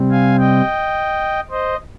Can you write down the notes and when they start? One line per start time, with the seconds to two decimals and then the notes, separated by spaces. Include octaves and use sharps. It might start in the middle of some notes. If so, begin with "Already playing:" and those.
Already playing: C3 G3 C4
0.11 F5 G#5
0.39 D#5 G5
1.51 C5 D#5